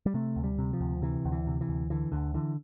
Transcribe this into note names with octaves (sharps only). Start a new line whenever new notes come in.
G3
C3 A3
D2
G3
C3
F3
D2
C3 E3
D2
E3
C3
E3
D2
D3 E3
D2 D3
D3 E3